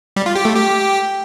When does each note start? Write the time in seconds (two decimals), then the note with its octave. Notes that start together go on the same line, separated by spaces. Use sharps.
0.16 G3
0.26 F4
0.36 G4
0.45 A3
0.55 G4